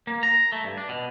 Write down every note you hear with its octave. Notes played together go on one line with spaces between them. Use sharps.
A#3
A#5
A3
G2
D4
B2